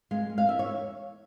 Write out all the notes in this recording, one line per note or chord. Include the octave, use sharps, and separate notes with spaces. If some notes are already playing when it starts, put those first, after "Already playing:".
G#3 F5
G#3
F5
E2 E5
C#5